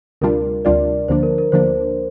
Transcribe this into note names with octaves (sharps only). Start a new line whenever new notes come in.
D2 C3 G3 D4 F4 A#4
D2 C3 G3 D4 F4 D5
D2 D3 F3 A#3 D4 C5
A#4
A#4
D2 D3 F3 A#3 D4 C5